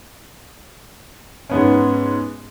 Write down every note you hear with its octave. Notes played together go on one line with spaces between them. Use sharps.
G#2 B3 C#4